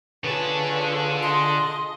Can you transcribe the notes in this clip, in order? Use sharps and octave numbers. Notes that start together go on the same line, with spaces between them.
D3 F4 G#4 A4 B4 C#5 A5
D#5 C6